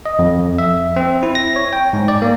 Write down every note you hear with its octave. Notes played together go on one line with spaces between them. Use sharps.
D#5
F2
E5
C4
E4
A#6
C#5
G5
G#2
D5
A#3